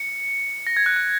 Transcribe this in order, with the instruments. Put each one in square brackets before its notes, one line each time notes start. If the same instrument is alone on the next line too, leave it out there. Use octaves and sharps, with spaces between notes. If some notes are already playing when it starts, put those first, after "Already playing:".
Already playing: [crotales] C#7
A#6
G#6
F#6
F#6